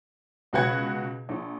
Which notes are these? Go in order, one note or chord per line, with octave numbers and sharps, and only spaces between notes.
C#2 B2 F#4 B4 F#5 G#6
A#1